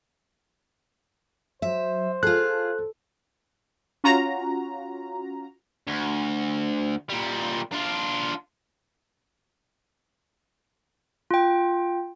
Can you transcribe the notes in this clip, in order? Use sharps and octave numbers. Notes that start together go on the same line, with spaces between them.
F#3 C5 E5
F4 G#4 A4 F#6
C#4 F4 F#4 A#5
D2
A#2 G3
D4 F4
F4 G5